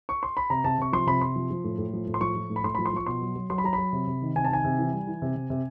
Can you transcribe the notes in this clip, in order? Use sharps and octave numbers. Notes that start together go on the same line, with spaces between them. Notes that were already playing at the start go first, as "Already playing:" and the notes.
C#6
C6
B5
C3 A#5
C3 A5
C3 C#6
F3 C6
C3 B5
C3 C6
F3
F3
A2
A2
F3
A2
C6
F3 C#6
F3
A2
B5
A2 C6
F3 B5
C6
F3 C#6
B2 C6
F#3
F#3
F#3 C6
B5
F#3 A#5
B5
F#3
C3
C3
D#3
C3 G#5
A5
D#3 G#5
C3
E3
G3
E3
C3
C3
C3